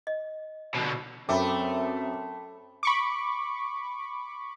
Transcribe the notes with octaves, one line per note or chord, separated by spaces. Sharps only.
D#5
B2 D3
F#2 A3 C4 E5 G5 B5 D6
B5 C#6 D6